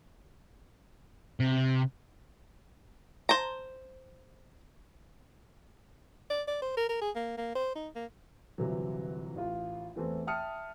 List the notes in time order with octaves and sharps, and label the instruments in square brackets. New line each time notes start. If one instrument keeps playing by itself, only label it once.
[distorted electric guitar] C3
[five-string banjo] C5 A5 A#5
[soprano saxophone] D5
D5
C5
A#4
A#4
G#4
A#3
A#3
C5
D#4
A#3
[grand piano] G1 C3 E3 F#3
A1 F4
E2 E3 A3 C4
E5 G5 A5 D#6 F6 C#7